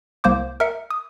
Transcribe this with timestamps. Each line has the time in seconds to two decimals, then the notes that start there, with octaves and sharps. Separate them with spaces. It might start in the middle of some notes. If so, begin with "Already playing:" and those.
0.24 C2 A#3 C5 D6
0.60 A#4 E5 C#7
0.90 D#6